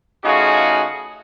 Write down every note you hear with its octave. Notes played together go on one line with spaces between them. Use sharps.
C#3 A3 D#4 F4 F#4 G#4